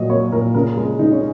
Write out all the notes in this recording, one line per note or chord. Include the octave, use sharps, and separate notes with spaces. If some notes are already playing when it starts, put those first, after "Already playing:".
Already playing: A#2 F#3 D#5
A#3 C#5
A#2 A#4
C#3 A#4
G#3 G#4
C#3 D#4
C#4